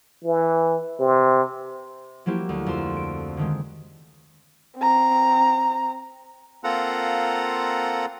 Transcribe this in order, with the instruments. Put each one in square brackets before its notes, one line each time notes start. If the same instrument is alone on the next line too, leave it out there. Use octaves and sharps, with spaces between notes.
[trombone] E3
C3
[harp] F3 F#3 A#3 E4 G4
D2
F2 C6 E7
D7
D3 D#3 G#3
[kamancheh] C4 A#5
[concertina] A#3 C4 F4 A4 F#5 A#5